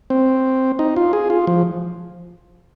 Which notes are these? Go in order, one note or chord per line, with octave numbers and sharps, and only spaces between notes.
C4
D#4
F4
G#4
F4
F3